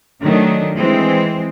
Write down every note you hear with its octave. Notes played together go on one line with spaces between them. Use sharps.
D#3 F#3 A3 D4
E3 G#3 C4